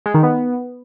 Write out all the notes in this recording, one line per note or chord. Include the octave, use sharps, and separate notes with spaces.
G#3
D#3
B3